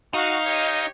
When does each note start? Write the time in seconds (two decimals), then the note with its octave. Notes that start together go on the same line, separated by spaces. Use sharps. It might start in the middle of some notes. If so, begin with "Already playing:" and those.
0.14 D#4 F#4 F5
0.44 G4 C#5 D#5